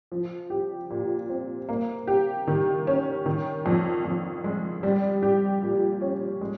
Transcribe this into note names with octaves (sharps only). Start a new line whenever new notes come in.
F3
G4
A#2
C4
A#3
G4
D#3
C#4
D#3
F2
F2
G#3
G3
G4
A#2
C#4
G#3